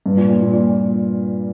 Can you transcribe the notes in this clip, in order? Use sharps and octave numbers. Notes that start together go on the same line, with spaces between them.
G2
A#2
A#2
A#2
A#2